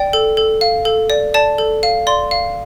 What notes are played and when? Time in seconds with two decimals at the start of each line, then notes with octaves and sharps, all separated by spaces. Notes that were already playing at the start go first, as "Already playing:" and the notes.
Already playing: D5 G5
0.13 A4
0.37 A4
0.61 F5
0.85 A4
1.10 D5
1.34 D5 A5
1.58 A4
1.83 F5
2.07 D5 C6
2.31 F5